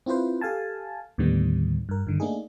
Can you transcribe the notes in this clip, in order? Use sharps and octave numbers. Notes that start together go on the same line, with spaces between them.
C4 E4 F4 B4 C5
G4 A4 F5 G#5 A5
D#2 A2 D3 D#3 G3 B3
G2 A#4
G2 D3 D#3
A3 A#3 D4 D#4 G#4